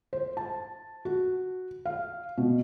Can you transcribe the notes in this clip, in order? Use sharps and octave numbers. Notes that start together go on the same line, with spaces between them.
C5
A5
F#4
F5
B2